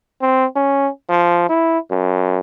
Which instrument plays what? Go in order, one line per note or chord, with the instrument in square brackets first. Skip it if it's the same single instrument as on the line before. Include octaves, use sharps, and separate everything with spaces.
[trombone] C4
C#4
F3
E4
F#2